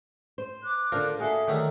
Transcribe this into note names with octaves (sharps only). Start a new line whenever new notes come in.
C5
D6 F#6
D3 D4 F4 A#4 C5
A#3 F#4 G#4 A4 E5
D3 D#3 F#3 A3 A#4